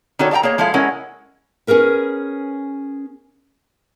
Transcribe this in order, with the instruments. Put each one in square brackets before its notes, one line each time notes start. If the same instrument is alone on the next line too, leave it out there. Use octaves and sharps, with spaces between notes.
[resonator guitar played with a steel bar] D#3 D4 D#4 F#4 A4 C#5
A4 D5 F5 G5 A#5
A#3 G#4 C#5
F3 G#3 D4 E4 A4 F5
G#3 C#4 E4 A#4 F#5
[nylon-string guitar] C#4 D4 G#4 A#4 B4